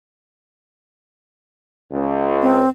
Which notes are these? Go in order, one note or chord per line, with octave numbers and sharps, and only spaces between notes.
C#2
C4